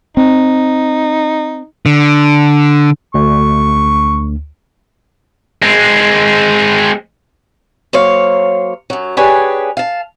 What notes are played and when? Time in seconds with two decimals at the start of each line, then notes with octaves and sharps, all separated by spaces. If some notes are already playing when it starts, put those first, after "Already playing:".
0.17 C4 D#4
1.86 D3
3.14 D2 C#6
5.62 G#3 C4
7.93 F#3 A#3 C5 C#5 F5
8.90 F#2 F#3
9.17 D4 G4 G#4 B4 C#5 G#5
9.77 F5 A5